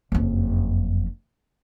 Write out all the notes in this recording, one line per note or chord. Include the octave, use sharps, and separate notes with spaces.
F#1 F2